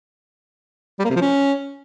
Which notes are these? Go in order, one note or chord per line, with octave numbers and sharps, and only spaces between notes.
G3
A#3
C3
F3
C#4